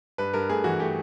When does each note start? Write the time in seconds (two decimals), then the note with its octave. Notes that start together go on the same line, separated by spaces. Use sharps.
0.18 G2 B4
0.34 G2 A#4
0.49 A3 G#4
0.64 E3 F#4
0.80 A3 G4